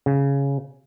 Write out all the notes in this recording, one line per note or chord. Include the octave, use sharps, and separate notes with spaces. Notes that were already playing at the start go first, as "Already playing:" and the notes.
C#3